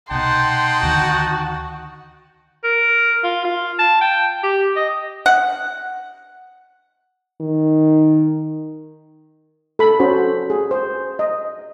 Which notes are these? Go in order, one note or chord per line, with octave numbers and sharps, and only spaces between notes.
C2 B2 D#4 F#5 G5 A5 C6
D2 D3 D#3 F#4
A#4
F4
F4
A5
G5
G4
D#5
F#5
D#3
A4 B5
C#4 F#4 C5
G#4
C5
D#5